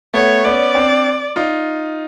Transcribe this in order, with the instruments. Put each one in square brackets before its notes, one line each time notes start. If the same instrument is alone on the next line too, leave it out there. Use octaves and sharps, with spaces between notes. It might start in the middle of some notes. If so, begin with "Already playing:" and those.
[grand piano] A3 B3 [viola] C#5
[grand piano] B3 C#4 [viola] D5
[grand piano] C4 D4
D#4 F4